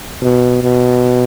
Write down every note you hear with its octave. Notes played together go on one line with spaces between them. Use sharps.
B2
B2